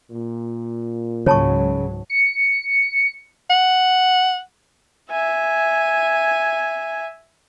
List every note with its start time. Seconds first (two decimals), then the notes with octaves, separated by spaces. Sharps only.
0.11 A#2
1.26 C#2 G#2 C#3 F#3 C#5 A5 C#6
2.10 C#7
3.50 F#5
5.10 E5 G#5